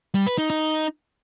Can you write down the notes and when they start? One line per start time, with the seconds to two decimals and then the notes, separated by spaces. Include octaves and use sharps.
0.15 G3
0.26 B4
0.38 D#4
0.50 D#4